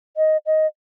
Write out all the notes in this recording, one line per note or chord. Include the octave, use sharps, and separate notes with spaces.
D#5
D#5